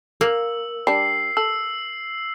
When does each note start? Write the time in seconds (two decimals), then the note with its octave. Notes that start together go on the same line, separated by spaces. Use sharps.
0.21 A#3 E6
0.87 G3 D4 C7
1.37 A4 E6